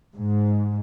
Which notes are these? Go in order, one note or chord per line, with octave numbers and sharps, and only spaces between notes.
G#2